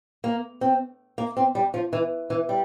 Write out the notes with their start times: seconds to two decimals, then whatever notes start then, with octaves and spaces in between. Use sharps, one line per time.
0.24 A#3
0.61 C4
1.18 A#3
1.37 C4
1.55 G3
1.74 F3
1.93 E3
2.30 E3
2.49 G3